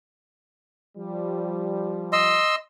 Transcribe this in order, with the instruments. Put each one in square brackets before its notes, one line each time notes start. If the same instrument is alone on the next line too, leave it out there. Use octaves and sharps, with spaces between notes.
[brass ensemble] F3 G3
[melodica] D#5 C6 E6